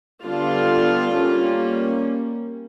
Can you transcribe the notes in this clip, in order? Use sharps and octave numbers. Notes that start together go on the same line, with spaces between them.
D3 G3 B3 D4 F4
G3 A#3 C#4